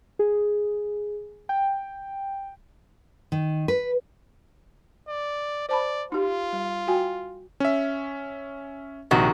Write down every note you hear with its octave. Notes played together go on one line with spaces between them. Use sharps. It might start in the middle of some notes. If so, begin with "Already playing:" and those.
G#4
G5
D#3
B4
D5
C5 D5 A5 B5
D#4 F4 G4
G3
F#4 G5 G#5
C#4 E5
A#1 C3 D#3 F#4